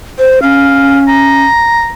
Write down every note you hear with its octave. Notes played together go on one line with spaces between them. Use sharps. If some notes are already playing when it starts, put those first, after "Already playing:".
C5
C#4 F5
A#5